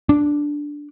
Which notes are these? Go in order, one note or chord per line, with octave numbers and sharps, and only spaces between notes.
D4